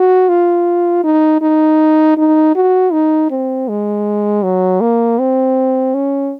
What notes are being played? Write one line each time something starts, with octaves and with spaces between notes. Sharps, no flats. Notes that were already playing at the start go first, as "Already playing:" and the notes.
Already playing: F#4
F4
D#4
D#4
D#4
F#4
D#4
C4
G#3
F#3
A#3
C4
C#4